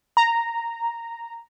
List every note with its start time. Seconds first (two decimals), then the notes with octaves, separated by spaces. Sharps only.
0.17 A#5